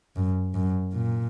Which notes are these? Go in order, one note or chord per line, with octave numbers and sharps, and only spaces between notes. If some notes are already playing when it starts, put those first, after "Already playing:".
F#2
F#2
A#2